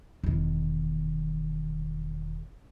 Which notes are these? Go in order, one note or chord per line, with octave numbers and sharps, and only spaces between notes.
E1 D#3